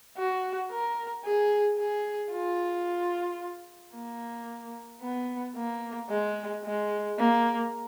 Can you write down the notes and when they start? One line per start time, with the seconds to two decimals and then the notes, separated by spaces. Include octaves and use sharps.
0.18 F#4
0.71 A#4
1.24 G#4
1.79 G#4
2.32 F4
3.95 A#3
5.02 B3
5.56 A#3
6.10 G#3
6.65 G#3
7.19 A#3